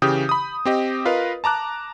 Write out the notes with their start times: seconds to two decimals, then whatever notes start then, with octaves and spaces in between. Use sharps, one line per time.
0.02 C#3 E3 G4 D#6 G6
0.29 B5 D#6
0.65 C4 G4 D#5
1.05 F4 A#4 B4 D#5 F5
1.44 A5 A#5 D6 F#6